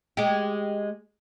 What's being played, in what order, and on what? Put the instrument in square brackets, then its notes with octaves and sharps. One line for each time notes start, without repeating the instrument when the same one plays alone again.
[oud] G#3 G4